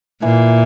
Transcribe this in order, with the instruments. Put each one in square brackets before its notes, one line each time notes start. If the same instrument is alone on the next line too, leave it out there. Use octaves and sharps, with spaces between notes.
[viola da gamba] A#2 [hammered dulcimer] E3